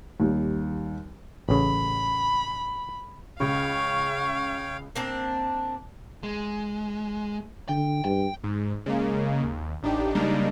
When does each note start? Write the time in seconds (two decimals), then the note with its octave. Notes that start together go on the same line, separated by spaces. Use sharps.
0.20 D#2 G3
1.49 A1 C#3 B5
3.40 C#2 C#3 C#5 F5 G5 C#6
4.96 A#3 C4 D4
6.23 G#3
7.69 D3 G5
8.05 G2 G5
8.44 G#2
8.86 C#3 G#3 A#3
9.43 D#2
9.83 A1 D4 D#4 G4
10.15 C#3 G3 G#3 A#3 D4 D#4